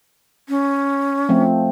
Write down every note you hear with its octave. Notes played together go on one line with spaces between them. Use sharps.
C#4
F3 A3 C4